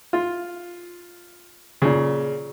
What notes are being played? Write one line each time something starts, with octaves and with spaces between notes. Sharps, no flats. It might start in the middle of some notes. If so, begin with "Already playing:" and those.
F4
A#2 C#3